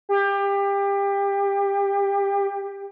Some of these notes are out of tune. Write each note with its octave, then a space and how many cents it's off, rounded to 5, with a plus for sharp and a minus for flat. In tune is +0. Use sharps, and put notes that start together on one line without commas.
G4 +25